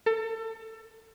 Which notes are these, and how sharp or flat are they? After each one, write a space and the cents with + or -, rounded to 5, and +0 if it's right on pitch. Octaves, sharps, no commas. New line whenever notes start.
A4 +30